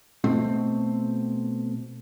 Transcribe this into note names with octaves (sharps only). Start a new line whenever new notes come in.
B2 A3 C4